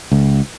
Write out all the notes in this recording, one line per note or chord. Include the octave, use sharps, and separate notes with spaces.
C#2